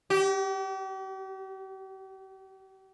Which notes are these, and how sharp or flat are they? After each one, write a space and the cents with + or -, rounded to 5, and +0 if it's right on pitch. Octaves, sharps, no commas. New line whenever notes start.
G4 -40